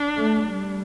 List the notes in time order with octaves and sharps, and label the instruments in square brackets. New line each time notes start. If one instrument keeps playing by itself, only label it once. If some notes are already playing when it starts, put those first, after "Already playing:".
Already playing: [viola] D4
[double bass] A3
G3